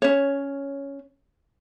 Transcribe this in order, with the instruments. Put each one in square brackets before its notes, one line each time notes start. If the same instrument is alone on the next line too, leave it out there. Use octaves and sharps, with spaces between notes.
[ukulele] C#4 C#5